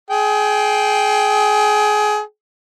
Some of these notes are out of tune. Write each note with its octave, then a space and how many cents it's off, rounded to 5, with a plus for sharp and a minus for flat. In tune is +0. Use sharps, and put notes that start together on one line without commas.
G#4 +25 G5 +0